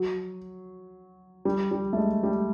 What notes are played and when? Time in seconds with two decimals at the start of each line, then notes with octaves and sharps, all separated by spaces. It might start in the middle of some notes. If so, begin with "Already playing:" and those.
Already playing: F#3
1.45 G3
1.71 G3
1.93 A3
1.97 G#3
2.23 G3